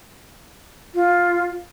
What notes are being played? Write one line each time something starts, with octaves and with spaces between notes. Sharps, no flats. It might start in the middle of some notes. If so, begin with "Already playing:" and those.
F4